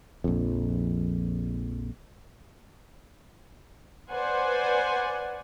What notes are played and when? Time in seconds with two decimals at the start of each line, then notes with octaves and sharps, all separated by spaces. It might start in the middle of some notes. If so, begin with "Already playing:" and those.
0.24 A#1 F2
4.11 B4 C5 D5 F#5 G#5